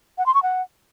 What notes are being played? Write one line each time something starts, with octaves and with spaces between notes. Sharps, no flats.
F#5
C6
C#6
F#5